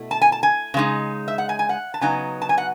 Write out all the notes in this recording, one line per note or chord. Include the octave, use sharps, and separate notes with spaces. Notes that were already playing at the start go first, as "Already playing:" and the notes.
Already playing: B2 A3 E4
A5
G#5
A5
G#5
C#3 G#3 D#4
E5
F#5
G#5
G#5
F#5
A5
C#3 F#3 B3 D#4 G#5
A5
G#5
F#5